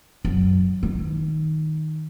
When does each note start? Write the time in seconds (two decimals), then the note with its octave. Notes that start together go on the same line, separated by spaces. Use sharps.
0.25 F#2
0.83 D#3